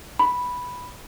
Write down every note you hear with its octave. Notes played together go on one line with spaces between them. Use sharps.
B5